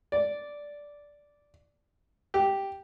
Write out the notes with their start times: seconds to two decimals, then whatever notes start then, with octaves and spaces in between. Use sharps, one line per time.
0.12 D5
2.34 G4